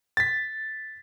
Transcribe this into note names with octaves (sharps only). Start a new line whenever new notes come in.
A6 B6